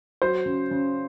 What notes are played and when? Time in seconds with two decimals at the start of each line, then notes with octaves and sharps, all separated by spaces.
0.22 F#3 C5
0.46 C#3
0.71 C#3